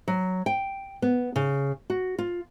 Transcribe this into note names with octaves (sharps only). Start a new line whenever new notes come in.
F#3
G5
B3
C#3
F#4
F4